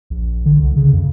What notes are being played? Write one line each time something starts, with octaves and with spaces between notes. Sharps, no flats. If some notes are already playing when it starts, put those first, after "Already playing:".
A#1
D3
C2
C#3
F2